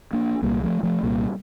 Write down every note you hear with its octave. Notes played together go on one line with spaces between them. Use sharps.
A#3 D4
C2 A#2 G3 A#3
F3 A3
F3 A3
C2 A#2 G3 A#3